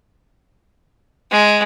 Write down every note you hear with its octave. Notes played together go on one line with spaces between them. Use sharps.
G#3